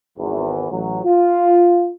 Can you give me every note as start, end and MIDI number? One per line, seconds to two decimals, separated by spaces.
0.17 0.70 32
0.17 0.70 40
0.70 0.99 33
0.70 0.99 54
1.03 1.90 65